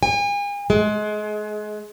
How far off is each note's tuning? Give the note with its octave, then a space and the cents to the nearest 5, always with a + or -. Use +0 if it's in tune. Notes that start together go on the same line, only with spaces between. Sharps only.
G#5 -40
G#3 +30